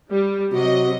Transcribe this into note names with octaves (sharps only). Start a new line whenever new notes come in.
G3
C3 F#3 F#4 D#5